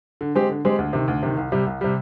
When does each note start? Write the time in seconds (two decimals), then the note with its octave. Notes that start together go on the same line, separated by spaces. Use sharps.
0.21 D3
0.35 G#3 C4 G4
0.49 D3
0.65 G#3 C4 G4
0.79 D2
0.93 C3 D#3
1.08 D2
1.23 C3 D#3
1.37 C2
1.52 C3 G3
1.66 C2
1.81 C3 G3